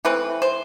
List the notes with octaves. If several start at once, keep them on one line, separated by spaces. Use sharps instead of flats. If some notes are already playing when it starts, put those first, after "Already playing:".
E3 A3 C4 B4
C5